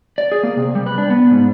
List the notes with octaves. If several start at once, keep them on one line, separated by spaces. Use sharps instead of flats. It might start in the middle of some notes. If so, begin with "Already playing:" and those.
D5
G#4
A#3
C3
G3
B4
D4
B3
G#2